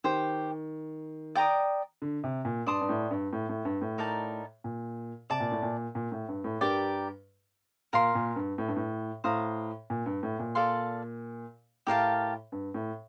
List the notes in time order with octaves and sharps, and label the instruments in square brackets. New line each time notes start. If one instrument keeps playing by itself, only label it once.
[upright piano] D#3 [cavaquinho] G4 C5 G5
[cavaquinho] D5 G5 A#5 D#6
[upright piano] D3
C3
A#2
[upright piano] G2 [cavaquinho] D5 A5 C6 D#6
[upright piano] G2
A2
G2
A2
A2
G2
A2
[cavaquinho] D#4 A#4 D5 A5
[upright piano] A#2
[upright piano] C3 [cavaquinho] D5 A5 D6
[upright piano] A#2
A2
A#2
A#2
A2
G2
A2
[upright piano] G2 [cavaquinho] G4 A#4 D5
[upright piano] A#2 [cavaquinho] A#4 F5 C6
[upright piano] A#2
G2
A2
G2
A2
[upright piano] A2 [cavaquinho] C5 F5 A#5 D#6
[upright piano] A#2
G2
A2
A#2
[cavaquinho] A4 D5 F5 C6
[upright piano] A2 [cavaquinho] G4 A#4 F5 A5
[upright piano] G2
A2